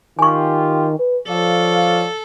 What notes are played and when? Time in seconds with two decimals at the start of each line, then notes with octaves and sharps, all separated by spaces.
0.19 D#3 F4 G4 G#5 C#6
0.99 B4
1.28 F3 A4 C#5 D5 F5